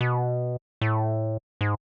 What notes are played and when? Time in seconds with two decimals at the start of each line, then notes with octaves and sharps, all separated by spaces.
0.01 B2
0.81 A2
1.61 G#2